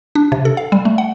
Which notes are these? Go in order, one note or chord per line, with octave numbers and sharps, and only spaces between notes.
D4
C3
A4
F5
G3
A3
F#5